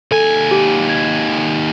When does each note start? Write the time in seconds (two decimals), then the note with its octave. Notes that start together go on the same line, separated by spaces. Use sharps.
0.12 D#2 A4 G#5
0.51 G4
0.90 G#6